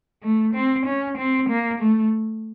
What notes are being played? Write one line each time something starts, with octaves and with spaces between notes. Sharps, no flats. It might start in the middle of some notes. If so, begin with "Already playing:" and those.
A3
C4
C#4
C4
A#3
A3